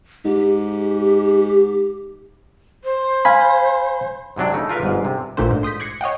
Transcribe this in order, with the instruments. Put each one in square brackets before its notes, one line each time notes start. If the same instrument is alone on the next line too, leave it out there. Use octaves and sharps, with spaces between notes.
[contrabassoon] G#2 [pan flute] G4
[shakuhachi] C5
[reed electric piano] F5 G#5 B5
[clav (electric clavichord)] G#2 C3 F#3 D4
C#3 A3 D#4
F4 A#4 B4 F5
G1 G#2
C3
[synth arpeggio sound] A1 A#2 A3 D4 C5
G#2
C6 D#6 G6 B6
D6 F#6 G#6 A#6 C7 C#7
C#5 D#5 F#5 G5